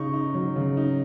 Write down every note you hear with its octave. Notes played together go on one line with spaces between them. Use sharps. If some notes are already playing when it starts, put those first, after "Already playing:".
Already playing: C#3 D#4 C#6
D#4
F#3
C#3
D#4